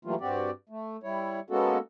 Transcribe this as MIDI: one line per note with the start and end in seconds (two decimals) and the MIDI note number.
0.05 0.15 52
0.05 0.15 54
0.05 0.15 55
0.05 0.15 57
0.05 0.15 58
0.05 0.15 65
0.20 0.50 43
0.20 0.50 60
0.20 0.50 66
0.20 0.50 67
0.20 0.50 74
0.69 0.97 57
1.03 1.40 55
1.03 1.40 64
1.03 1.40 73
1.50 1.78 56
1.50 1.78 58
1.50 1.78 59
1.50 1.78 61
1.50 1.78 66
1.50 1.78 69